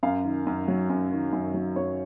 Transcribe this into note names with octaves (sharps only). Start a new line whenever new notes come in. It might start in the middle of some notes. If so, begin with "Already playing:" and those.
F#2 F5
D#3
F#2
F#3
F#2
D#3
F#2
F#3
F#2 C#5